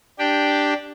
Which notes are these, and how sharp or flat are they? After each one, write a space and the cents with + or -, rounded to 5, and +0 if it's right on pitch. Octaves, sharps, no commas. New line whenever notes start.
D4 +0 G4 +0 G5 +5